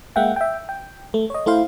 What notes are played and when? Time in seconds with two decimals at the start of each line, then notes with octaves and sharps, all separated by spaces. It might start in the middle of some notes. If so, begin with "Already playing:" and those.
0.16 G#3 A#3 E5 F#5 G5
0.36 E5 G5
0.69 G5
1.14 A3
1.30 C#5 D#5
1.46 A3 E4 C5 F5